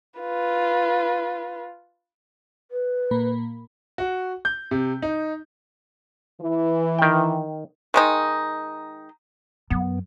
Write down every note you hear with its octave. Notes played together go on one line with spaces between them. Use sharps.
F4 B4
B4
A#2 A#3 B5
F#4
G6
C3
D#4
E3
D#3 G5
D#3 G#3 D#4
F#2 B3